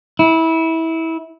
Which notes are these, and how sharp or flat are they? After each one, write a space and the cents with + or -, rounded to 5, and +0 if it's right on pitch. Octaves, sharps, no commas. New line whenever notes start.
E4 -20